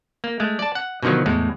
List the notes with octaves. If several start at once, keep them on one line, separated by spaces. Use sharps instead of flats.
A#3
G#3 A3
D5 A5
F#5
B2 D3 D#3 F3 F#3
E2 A2 G#3